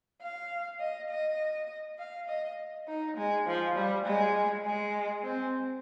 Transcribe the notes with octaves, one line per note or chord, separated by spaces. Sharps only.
F5
D#5
D#5
F5
D#5
D#4
G#3
F3
G3
G#3
G#3
C4